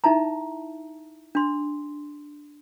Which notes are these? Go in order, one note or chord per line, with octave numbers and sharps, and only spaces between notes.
D#4 E4 E5 A5 A#5
D4 C6